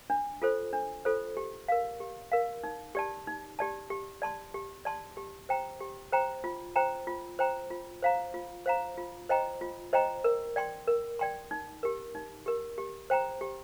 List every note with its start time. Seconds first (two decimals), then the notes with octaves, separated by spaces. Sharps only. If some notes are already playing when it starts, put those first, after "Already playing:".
0.10 D4
0.42 F4 A4 C5
0.73 D4
1.05 F4 A4 C5
1.37 G4
1.68 A#4 F5
2.00 G4
2.32 A#4 F5
2.63 D#4
2.95 G4 D5 A5
3.27 D#4
3.59 G4 D5 A5
3.90 G4
4.22 D5 A5 C6
4.54 G4
4.85 D5 A5 C6
5.17 G4
5.49 C5 G5 A#5
5.81 G4
6.12 C5 G5 A#5
6.44 F4
6.76 C5 G5 A#5
7.07 F4
7.39 C5 G5 A#5
7.70 F4
8.02 C5 F5 A#5
8.34 F4
8.66 C5 F5 A#5
8.98 F4
9.29 C5 D#5 G5 A#5
9.61 F4
9.93 C5 D#5 G5 A#5
10.24 A#4
10.56 D5 G5 C6
10.87 A#4
11.19 D5 G5 C6
11.51 D#4
11.83 G4 A#4
12.15 D#4
12.46 G4 A#4
12.78 G4
13.10 C5 G5 A#5
13.41 G4